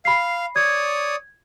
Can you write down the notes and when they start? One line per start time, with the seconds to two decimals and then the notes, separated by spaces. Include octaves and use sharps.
0.05 F5 B5 C7
0.56 C#5 D5 D#6 G#6